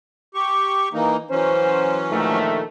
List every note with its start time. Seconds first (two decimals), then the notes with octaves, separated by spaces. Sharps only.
0.35 G4 C#6
0.93 E3 A#3 D#4
1.31 E3 F#3 C#4 C5
2.10 A#1 D#3 A3